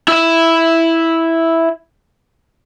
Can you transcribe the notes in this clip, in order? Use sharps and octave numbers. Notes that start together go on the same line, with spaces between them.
E4 E5